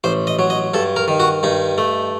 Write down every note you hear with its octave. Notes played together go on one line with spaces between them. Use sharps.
A1 C5
D#5
F#3
D#5
G2 A4
A#4
D#3
F#4
G2 D#4
A3